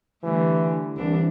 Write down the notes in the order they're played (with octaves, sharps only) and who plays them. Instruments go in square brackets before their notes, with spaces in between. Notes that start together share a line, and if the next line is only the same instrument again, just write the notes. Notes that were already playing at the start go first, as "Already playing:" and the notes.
[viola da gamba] D3 G3 A3 [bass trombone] E3
[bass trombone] C2 [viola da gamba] E3 D4